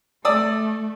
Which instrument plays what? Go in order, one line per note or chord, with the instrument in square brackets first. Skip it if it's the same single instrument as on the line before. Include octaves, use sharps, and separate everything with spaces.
[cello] A3 [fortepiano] D5 D#6 E6